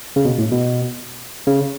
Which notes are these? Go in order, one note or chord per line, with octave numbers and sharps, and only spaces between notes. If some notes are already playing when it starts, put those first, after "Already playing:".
C#3
B2
A2
B2
C#3